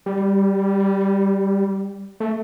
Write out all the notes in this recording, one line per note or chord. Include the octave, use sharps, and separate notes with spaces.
G3
A3